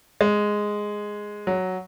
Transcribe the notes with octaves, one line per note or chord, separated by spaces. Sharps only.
G#3
F#3